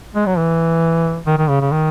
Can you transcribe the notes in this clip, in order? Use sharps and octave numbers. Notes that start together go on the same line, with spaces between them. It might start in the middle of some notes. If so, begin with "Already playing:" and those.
G#3
F#3
E3
D#3
D#3
C#3
C#3
D#3